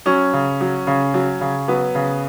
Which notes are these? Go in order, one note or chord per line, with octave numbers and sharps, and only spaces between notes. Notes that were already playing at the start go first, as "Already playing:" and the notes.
F#3 C#4
C#3
F#3
C#3
F#3
C#3
F#3 B3
C#3